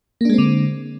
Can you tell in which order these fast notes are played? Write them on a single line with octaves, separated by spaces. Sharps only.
A#3 D4 G#3 C4 D3